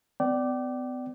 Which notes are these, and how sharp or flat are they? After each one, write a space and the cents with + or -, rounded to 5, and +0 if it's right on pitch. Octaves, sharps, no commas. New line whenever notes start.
B3 +40 D5 +0 G5 -40